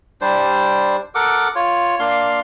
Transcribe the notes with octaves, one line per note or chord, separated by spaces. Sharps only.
G3 D4 C5
A4 A#4 F#5 D6
F4 C#5
A#3 D4 F5 C6